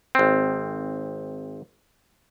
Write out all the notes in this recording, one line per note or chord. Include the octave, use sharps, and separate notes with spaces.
G#1 C4